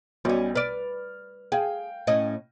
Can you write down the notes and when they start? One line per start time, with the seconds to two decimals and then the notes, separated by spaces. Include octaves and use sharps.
0.25 B1 B2 G3 C#4 D5
0.55 B4 D5 F6
1.52 G#4 F5 G5
2.07 A2 C#4 D#5